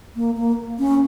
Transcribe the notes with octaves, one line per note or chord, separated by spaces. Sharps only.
A#3
A#3
C#4